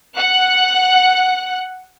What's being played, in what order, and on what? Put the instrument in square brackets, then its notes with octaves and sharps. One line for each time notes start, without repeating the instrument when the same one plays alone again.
[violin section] F#5 F#6